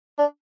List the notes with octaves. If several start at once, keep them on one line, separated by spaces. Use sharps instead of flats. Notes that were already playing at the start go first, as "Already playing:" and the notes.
D4